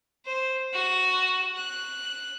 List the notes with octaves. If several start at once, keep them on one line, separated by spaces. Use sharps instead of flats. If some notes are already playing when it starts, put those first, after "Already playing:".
C5
F#4
F#6